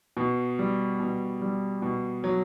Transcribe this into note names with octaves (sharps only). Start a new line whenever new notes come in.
B2
G3
B2
G3
B2
F#3